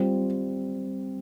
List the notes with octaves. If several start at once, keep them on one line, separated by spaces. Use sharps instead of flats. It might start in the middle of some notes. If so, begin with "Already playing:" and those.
Already playing: G3 C4 F4